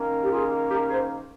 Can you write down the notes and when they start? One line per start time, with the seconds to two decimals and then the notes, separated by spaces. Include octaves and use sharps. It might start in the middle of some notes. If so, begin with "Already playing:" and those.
Already playing: D#3 A#3 C#4
0.22 G4
0.32 F4 G#4
0.70 G4 A#4
0.90 G#4 C5